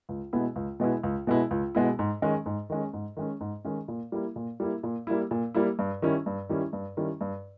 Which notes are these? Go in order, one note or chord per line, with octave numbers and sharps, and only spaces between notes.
C#2
B2 G#3 B3 E4
C#2
B2 G#3 B3 E4
C#2
B2 G#3 B3 E4
C#2
B2 G#3 B3 E4
G#2
D#3 G#3 C#4
G#2
D#3 G#3 C#4
G#2
D#3 G#3 C#4
G#2
D#3 G#3 C#4
A#2
G3 A#3 E4
A#2
G3 A#3 E4
A#2
G3 A#3 E4
A#2
G3 A#3 E4
G2
D#3 G3 C#4 E4
G2
D#3 G3 C#4 E4
G2
D#3 G3 C#4 E4
G2